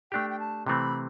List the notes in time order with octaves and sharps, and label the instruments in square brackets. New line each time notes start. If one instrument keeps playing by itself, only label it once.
[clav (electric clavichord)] A3 D4 G4 [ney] G5
[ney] G5
A5
[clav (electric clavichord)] C3 E3 A3 C4 [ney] B5